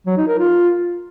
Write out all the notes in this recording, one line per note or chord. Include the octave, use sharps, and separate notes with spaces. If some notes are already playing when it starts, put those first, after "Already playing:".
F#3
D#4
A#4
F4